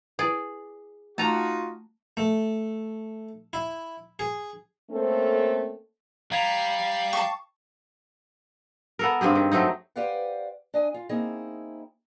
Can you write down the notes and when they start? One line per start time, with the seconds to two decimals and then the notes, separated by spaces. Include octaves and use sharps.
0.19 E4 G#4 B4 D5
1.18 A3 D#4 F4 F#4 A5 A#5
2.17 A3
3.53 E4
4.19 G#4
4.90 A3 A#3 C4 C#4 A4
6.32 G3 F5 A#5 G#6 F7
7.13 G5 A5 C#6 D6
8.99 B3 A4 A#4
9.21 G2 C4 G4 G#4
9.35 D#3
9.52 F#3 A3 C4 D#4
9.96 G4 B4 C5 D5 F5 F#5
10.74 D4 D#5 G#5
10.94 F4
11.09 A#3 C4 D#4 E4 G#4